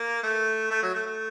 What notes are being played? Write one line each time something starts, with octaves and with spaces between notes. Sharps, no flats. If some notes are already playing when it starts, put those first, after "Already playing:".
Already playing: A#3
A3
A3
F#3
A3
A3